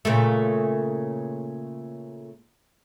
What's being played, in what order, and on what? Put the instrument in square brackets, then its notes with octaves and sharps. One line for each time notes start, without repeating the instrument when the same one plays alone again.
[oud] A#2 C#3 A3